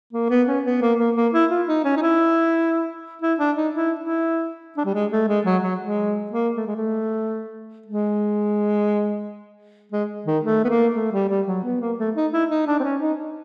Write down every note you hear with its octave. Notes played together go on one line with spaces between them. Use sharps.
A#3
B3
C#4
B3
A#3
A#3
A#3
E4
F4
D#4
C#4
D#4
E4
E4
D4
D#4
E4
E4
D4
G3
G#3
A3
G#3
F#3
F#3
G#3
A#3
A3
G#3
A3
G#3
G#3
D#3
A3
B3
A#3
A3
G3
G3
F#3
B3
A#3
A3
D#4
E4
D#4
D4
C4
C#4
D#4